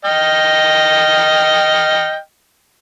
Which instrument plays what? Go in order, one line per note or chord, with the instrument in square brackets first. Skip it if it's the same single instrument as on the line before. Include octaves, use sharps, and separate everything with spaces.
[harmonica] D#5 G5 F6